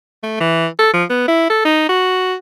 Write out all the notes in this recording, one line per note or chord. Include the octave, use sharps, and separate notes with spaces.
A3
E3
A4
F3
B3
E4
A4
D#4
F#4